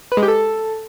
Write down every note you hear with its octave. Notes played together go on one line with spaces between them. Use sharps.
B4
G#3
G4
A4